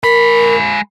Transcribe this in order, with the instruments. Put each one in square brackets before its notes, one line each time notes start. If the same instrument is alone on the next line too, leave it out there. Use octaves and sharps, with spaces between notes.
[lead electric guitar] G#3 B5 [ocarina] A#4